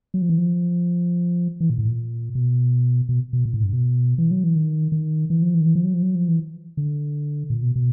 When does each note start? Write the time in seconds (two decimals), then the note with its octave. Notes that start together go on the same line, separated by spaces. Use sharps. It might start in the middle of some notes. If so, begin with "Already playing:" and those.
0.14 F#3
0.22 F3
0.29 E3
0.38 F3
1.60 E3
1.70 A#2
1.79 A2
1.88 A#2
2.35 B2
3.09 B2
3.33 B2
3.45 A#2
3.54 A2
3.63 G2
3.73 B2
4.18 E3
4.31 F#3
4.44 E3
4.56 D#3
4.92 D#3
5.30 E3
5.42 F3
5.55 E3
5.61 D#3
5.66 E3
5.75 F3
5.84 F#3
5.94 F3
6.02 F#3
6.15 F3
6.28 E3
6.77 D3
7.50 A#2
7.62 B2
7.76 B2